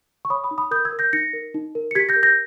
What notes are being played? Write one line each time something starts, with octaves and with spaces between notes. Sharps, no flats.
C#6
C#5 B5 D#6
B5 D#6
D#4
B5 D#6
A#4 D#6 G6
E6 G#6
A#4
G6 A#6
D#4 A#6 C#7
A#4
D#4
A#4
C#7
G4 G#6 B6
G6 A#6
A#4
G6 A#6